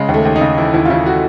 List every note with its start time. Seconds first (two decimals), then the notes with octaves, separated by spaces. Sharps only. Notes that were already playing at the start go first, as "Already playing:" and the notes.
Already playing: C#3 G#3
0.08 D#2
0.14 A3
0.25 D#2
0.36 D#4
0.41 C#3
0.57 E3 E4
0.74 D#2 E4
0.85 F4
0.90 C#3 E4
1.06 F#4